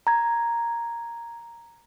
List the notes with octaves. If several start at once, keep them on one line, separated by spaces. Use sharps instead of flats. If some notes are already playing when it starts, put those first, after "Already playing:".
A#5 G#6